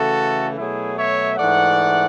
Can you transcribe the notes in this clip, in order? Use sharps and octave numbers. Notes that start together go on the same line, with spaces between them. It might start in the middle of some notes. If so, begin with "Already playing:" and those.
Already playing: C#3 E3 A3 F#4 A4
B2 F#3 A3 E4 G#4
C#5 E5
G#2 E3 A3 D5 F#5